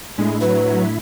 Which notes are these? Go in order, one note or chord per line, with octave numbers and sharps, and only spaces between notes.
A2 G#3 A3 D4 E4
F#3 B4